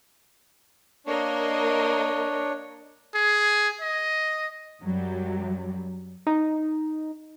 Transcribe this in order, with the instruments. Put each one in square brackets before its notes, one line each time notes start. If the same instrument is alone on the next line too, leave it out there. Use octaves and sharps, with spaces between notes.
[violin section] A#3 A#4 D#5 [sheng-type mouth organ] D4 C#5
[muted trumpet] G#4
D#5
[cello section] F#2 F#3 G3
[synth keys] D#4